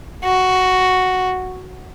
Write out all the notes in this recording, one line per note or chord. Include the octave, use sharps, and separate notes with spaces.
F#4